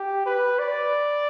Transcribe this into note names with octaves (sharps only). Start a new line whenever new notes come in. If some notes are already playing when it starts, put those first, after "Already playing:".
Already playing: G4
B4
D5